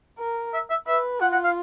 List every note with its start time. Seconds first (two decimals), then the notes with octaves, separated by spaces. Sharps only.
0.19 A#4
0.54 E5
0.70 E5
0.87 B4 E5
1.21 F4 F#5
1.32 F#5
1.44 F5